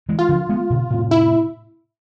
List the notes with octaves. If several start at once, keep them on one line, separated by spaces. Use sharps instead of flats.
E3 G#3
F4
D3 F3
G#3 B3
B2 D3
A2 C3
E4